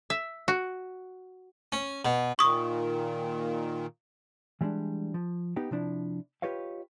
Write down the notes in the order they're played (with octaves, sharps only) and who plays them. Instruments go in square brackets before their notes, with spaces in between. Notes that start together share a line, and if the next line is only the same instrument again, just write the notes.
[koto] E5
F#4
[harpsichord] C#4
B2
[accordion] A#2 D#3 [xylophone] C#6 D#6
[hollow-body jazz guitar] E3 G3 G#3 C4 D4
F3
B3 D#4 G4
C3 F3 D4 E4
F4 G4 B4 C#5 D#5 F5